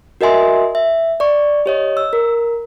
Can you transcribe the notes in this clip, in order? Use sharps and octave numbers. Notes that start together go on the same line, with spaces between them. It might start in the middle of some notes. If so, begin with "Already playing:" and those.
F#4 A#4 D#5 E5 G#5 C6
E5
D5 C#6
G4 C#5 D#5
E6
A#4